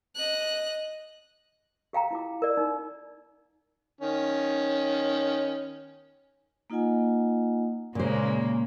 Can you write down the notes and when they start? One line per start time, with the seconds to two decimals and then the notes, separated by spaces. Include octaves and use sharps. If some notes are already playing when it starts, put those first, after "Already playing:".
0.16 D#5 F#6
1.93 G4 F5 G5 A#5
2.11 E4 F4 D6
2.42 A#4 D5
2.57 D#4
4.01 D#3 C#4
6.70 A#3 D#4 F4 D#5 F#5 G#5
7.95 A#2 C#3 G#3 A#3 C5